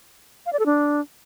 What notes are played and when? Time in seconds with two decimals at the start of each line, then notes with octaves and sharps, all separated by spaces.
0.46 F5
0.53 D5
0.59 A4
0.66 D4